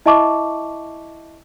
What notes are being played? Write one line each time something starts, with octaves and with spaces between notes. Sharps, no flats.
E4 D#5 E5 A5 C#6 D6